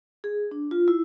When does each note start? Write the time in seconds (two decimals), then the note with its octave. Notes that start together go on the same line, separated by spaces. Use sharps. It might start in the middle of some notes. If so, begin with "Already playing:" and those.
0.24 G#4
0.51 D4
0.71 F4
0.88 E4